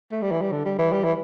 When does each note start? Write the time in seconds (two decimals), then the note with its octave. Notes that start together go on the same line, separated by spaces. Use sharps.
0.12 A3
0.22 G3
0.32 E3
0.42 G3
0.52 D3
0.65 G3
0.79 E3
0.92 G3
1.04 E3